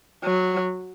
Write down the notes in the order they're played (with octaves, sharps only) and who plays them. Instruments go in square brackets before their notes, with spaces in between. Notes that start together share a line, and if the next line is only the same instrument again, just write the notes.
[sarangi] F#3